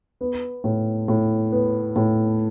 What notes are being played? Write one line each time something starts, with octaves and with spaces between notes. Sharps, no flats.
B3
A2
A2
B3
A2